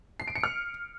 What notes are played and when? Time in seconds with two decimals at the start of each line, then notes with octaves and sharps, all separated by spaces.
0.20 C7
0.28 D7
0.36 C#7
0.43 F6